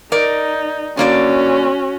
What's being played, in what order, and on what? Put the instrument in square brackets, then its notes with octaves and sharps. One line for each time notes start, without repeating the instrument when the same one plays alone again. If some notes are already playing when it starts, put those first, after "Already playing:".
[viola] D#4 [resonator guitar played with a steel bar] A#4 D5
[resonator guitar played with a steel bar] D3 A#3 D5 [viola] C#4 F#4